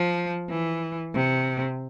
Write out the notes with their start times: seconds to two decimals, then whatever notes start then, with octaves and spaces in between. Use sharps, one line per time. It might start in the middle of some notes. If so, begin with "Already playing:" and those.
Already playing: F3
0.49 E3
1.15 C3